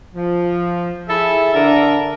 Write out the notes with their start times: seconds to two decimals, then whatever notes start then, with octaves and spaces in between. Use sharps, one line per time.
0.15 F3
1.08 E4 G#4 A4 E5
1.54 D3 D4 A#4 E5 A#5